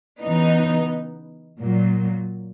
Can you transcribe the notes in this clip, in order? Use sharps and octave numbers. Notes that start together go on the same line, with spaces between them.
C#3 E3 B3 D#4
A#2 F#3